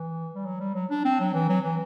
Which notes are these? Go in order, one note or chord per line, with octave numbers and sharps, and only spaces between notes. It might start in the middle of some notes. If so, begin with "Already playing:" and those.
Already playing: E3
G3
F#3
G3
F#3
D4
C4
F#3
E3
F#3
E3